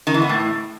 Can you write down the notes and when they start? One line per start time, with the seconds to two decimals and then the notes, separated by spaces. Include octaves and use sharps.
0.07 D#3
0.14 E3
0.22 B3
0.29 A2